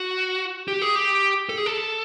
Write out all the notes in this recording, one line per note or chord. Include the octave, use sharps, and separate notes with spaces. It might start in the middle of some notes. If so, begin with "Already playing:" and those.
Already playing: F#4
G4
G#4
G4
A4
G#4
A4